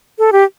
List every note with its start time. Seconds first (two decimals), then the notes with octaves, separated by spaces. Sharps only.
0.19 A4
0.32 G4